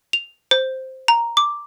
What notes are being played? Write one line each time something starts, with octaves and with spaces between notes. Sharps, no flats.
F7
C5
A#5
D6